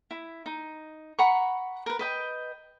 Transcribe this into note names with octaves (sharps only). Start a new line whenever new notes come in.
E4
D#4
F#5 A#5 B5 C#6
A#4 B4
B4 D#5 G5